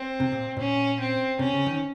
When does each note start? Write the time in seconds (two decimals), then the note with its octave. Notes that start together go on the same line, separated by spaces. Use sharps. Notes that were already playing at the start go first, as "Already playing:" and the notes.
Already playing: C4
0.20 C3
0.32 A#2
0.57 A#2 C#4
1.00 C4
1.39 C3 C#4
1.53 C#3
1.66 D#3